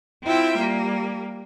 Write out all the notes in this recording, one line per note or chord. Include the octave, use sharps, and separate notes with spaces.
C4 E4 F4 E5 G5
G3 A#3